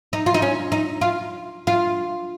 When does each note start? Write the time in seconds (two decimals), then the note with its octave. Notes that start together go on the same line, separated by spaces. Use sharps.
0.13 D#4
0.26 F4
0.34 D#4
0.42 C#4
0.72 D#4
1.01 F4
1.67 F4